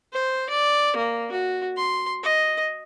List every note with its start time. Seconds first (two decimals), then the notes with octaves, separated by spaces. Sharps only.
0.13 C5
0.49 D5
0.96 A#3
1.32 F#4
1.77 C6
2.23 D#5